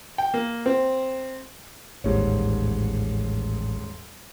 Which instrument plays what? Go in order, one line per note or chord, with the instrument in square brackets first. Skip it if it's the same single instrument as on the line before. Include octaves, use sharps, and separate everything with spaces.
[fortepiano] G5
A#3
C4
[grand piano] D#1 G#2 C#5 [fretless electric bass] A1